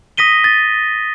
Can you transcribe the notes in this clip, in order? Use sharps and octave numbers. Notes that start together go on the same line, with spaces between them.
D#6 A#6 B6 D#7 G7
A6